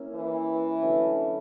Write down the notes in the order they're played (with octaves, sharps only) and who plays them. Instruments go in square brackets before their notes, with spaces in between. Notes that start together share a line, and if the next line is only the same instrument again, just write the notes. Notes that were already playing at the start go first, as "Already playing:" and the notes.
Already playing: [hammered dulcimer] A#3 C#4 E4
[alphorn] E3
[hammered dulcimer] D3 F#3 A3 C#4